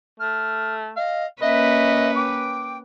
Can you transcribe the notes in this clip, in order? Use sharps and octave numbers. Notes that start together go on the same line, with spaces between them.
A3 F6
D#5 F5
A#3 C#4 B4 D#5 E5
G5 D6